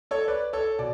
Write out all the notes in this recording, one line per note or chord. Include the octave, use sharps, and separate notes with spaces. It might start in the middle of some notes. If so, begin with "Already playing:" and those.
A4 C#5
B4 D5
A4 C#5
B2 D5